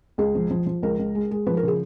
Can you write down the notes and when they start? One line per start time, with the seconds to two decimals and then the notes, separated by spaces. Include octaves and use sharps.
0.18 C#2 G#4
0.35 F3
0.51 F3
0.66 F3
0.83 C#2 A#4
0.99 C#2
1.15 G#3
1.31 G#3
1.47 F3 B4
1.57 A#4
1.63 C#3
1.68 G#4